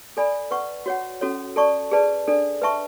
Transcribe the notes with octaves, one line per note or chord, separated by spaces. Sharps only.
A4 D5 G#5 B5
B4 F#5 C#6
F#4 C#5 F#5
C#4 F#4 A4 C#5
A4 D5 A5 C#6
G#4 B4 D5 A5
D4 A4 D5
B4 E5 A5 C#6